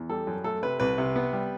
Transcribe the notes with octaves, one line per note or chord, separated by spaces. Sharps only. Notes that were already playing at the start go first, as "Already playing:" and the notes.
Already playing: E2
G3 A4
F#2
A3 A4
C3 B4
C2 B4
C3
B3
G3